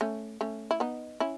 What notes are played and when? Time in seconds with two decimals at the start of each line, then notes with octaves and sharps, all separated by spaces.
0.01 A3 C#4
0.41 A3 C#4
0.71 E4
0.80 B3 D#4
1.20 C#4 E4